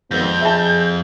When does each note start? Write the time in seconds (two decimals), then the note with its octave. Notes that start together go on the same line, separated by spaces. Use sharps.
0.11 G#1 F2 B3 G6
0.41 G#4 E5 A5